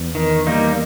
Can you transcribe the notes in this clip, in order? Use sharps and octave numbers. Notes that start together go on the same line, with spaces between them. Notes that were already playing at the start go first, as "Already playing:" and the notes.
Already playing: E2
D#3
G3 A#3 D#4